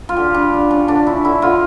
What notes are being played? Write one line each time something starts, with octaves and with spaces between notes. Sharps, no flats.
F4
D3 G4
G3 D4
G3
C#4 D4
D3 D4
C#4 E4
D3 E4
D3 F4